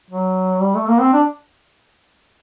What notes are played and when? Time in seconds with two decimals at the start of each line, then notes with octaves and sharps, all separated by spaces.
0.11 F#3
0.61 G3
0.75 A3
0.87 A#3
1.01 C4
1.13 D4